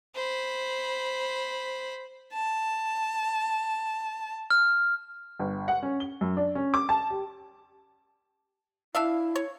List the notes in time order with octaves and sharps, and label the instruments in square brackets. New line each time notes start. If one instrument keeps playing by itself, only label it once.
[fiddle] C5 B5
[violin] A5
[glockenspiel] F6
[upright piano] G1
F#5
C#4
G7
F#2
D4
C#4
D6
A5
G4
[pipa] D4 E5 F5 [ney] E4
[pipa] C#5